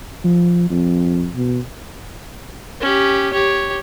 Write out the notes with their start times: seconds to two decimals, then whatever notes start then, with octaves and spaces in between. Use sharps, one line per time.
0.24 F3
0.70 F2
1.35 B2
2.81 C#4 G4
3.33 G4 C#5